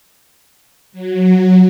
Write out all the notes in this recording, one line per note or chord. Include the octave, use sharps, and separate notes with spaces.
F#3